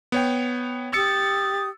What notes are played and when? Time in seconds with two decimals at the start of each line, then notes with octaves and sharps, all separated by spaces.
0.12 B3 C#5 G5
0.93 G4 D#6 E6 A6 C#7